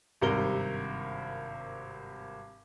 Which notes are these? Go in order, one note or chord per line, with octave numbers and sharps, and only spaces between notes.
G#1 G2 C3 A#4 G7